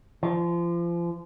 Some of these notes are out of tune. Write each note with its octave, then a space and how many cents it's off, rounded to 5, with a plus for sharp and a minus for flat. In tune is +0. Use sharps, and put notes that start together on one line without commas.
F3 -30